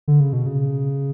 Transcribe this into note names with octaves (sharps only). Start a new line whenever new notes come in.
D3
C#3
B2
C#3